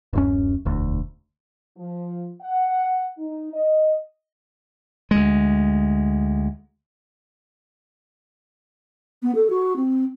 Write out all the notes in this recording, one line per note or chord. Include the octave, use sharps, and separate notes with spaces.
D1 F#2 C#4
E1 D2
F3
F#5
D#4
D#5
D2 G#3
B3
A4
F#4
C4